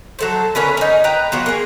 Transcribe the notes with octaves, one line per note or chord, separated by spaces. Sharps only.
F#3 A4 C5
D3 C#4 A#4 B4
C#4 D#4
B4 G5 A#5
F#3 B3 F4
A#3 G#4